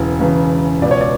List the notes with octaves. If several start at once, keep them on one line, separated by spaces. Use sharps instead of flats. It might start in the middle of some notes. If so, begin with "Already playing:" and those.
Already playing: E1 E2 C#3 E3
E1 E2 C#3 E3
C#2 B2 D5
C#5
D5